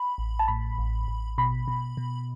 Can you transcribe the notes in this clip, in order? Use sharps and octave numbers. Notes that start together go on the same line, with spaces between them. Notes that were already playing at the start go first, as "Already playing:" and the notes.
Already playing: B5
A1
A5
A2 B5
A1
A1
B2 B5
B2
B2